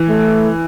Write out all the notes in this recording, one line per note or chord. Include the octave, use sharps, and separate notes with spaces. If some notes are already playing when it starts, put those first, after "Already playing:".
Already playing: E3
A3